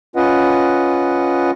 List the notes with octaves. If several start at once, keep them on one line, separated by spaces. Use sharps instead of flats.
C#4 F4 B4 D#5 F#5